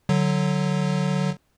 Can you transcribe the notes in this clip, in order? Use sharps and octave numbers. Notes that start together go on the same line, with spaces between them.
D3 F#3